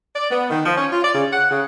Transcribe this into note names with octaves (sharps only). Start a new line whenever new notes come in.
D5
B3
D#3
F3
C#4
F4
D5
C#3
F#5
C#3